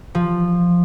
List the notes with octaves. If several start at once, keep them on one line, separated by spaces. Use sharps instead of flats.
F3